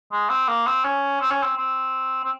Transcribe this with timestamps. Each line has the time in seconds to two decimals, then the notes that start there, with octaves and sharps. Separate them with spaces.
0.12 G#3
0.30 C4
0.48 A#3
0.67 C4
0.84 C#4
1.21 C4
1.31 C#4
1.43 C4
1.57 C4
2.24 C4